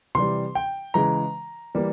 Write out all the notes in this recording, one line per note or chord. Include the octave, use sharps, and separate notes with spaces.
C3 E3 G3 C6
G5
C#3 E3 G#3 A#5
E3 G3 A#3